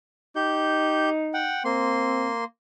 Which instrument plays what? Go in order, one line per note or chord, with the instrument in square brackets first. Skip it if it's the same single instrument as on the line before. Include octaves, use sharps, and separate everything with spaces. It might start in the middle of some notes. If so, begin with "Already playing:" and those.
[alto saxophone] D#4 [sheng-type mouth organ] G4 G6
[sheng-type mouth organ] F#5 G5
[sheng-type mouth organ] A#3 C6 [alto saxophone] C4